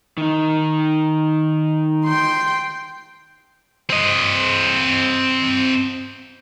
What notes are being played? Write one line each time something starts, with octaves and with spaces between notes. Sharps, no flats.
D#3 D#4
G5 C6
C4 D#5